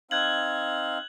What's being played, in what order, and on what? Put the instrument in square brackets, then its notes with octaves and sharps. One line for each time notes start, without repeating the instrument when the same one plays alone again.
[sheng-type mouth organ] C4 D#4 F5 [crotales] F#6 G#6 F#7